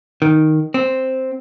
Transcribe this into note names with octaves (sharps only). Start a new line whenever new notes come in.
D#3
C4